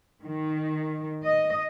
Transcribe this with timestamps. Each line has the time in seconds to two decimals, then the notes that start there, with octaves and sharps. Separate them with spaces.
0.24 D#3
1.25 D#5